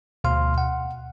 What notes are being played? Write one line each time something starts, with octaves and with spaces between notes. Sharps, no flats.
D2 B2 F5 C6 F6
F#5